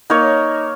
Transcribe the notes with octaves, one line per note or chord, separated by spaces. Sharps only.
A#3 D#4 A#4 C#5